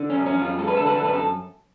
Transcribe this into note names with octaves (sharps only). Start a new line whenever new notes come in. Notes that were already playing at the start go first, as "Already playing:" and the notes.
Already playing: D3
C#4
F#2
C#4
F#2 F4
G#3 A4
B4
D3 A4
B4
A4
F#2 B4
A4